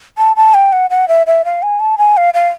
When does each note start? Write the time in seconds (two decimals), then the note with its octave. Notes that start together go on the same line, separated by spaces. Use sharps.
0.18 A5
0.36 A5
0.54 G5
0.72 F#5
0.90 F#5
1.08 E5
1.27 E5
1.45 F5
1.62 G#5
1.80 A5
1.98 G#5
2.17 F5
2.34 F5